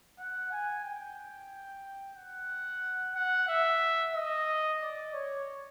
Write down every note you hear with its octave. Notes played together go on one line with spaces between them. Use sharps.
F#5
G#5
G5
F#5
F#5
E5
D#5
D5
C#5